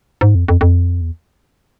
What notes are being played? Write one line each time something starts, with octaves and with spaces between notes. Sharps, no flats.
G#2
F2
F2
F2
E2